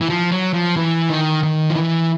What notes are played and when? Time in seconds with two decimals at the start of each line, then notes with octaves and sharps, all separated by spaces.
0.01 E3
0.10 F3
0.32 F#3
0.53 F3
0.77 E3
1.10 D#3
1.43 D#3
1.70 F3
1.76 E3